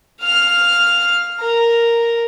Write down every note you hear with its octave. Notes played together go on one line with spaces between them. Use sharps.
F5 F6
A#4